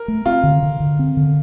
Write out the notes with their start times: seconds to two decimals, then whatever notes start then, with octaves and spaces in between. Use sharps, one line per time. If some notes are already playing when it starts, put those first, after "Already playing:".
Already playing: A#4
0.08 A3
0.26 C4 F4
0.43 D3
0.63 D3
0.80 D3
0.99 C4
1.17 D3